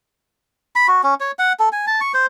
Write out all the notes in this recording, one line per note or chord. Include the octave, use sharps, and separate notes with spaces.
B5
F#4
C#4
C#5
F#5
A4
G#5
A5
C#6
C5